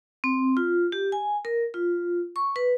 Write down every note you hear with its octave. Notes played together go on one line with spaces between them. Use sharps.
C4
F4
G4
G#5
A#4
F4
C#6
B4